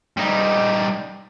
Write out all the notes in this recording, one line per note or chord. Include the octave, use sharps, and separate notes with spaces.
G3 D#4